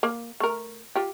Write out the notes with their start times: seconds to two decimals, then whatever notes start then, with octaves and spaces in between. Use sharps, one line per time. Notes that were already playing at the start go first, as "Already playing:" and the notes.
0.03 A#3
0.40 A3 A#4
0.95 F4 G4